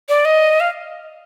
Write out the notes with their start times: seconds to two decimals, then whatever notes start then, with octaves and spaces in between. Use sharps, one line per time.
0.09 D5
0.25 D#5
0.60 F5